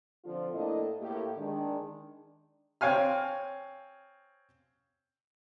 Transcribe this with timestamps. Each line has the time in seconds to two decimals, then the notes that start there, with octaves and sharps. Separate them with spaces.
0.23 D3 F3 C4 F4
0.53 A2 A#3 D4 E4 A4 D#5
1.00 A2 A#3 G4
1.36 D#3 G#3 D4
2.81 C4 C#5 F5 G#5 F6